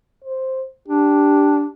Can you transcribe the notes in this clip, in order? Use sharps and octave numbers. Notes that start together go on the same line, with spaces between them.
C5
D4 G4